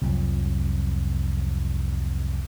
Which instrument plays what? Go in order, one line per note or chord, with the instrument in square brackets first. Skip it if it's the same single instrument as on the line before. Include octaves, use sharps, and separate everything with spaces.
[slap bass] C2 F2 F3 F#3